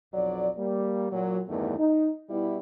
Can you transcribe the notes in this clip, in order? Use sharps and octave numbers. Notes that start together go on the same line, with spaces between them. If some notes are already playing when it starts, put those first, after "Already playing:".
B1 F2 B2 F#3 D5
G3 A#3
A#2 F#3
E2 G2 D#3 A3 B3 E4
D#4
B2 G3 E4